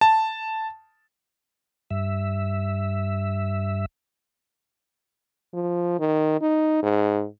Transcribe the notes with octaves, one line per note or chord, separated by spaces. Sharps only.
A5
G2 E5
F3
D#3
D#4
G#2